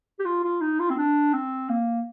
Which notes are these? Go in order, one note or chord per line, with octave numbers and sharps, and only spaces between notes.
G4
F4
F4
D#4
F4
C4
D4
C4
A#3